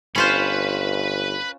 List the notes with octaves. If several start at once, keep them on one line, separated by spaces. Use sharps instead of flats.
G1 C#4 F4 B4 C5 B5